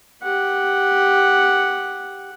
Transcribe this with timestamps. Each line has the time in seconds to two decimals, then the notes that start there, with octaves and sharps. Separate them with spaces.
0.23 G4 F#5